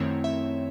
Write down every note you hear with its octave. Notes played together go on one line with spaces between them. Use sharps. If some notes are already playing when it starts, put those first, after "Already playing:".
Already playing: F#2 D#3 A3 C4 E4 C#5
E5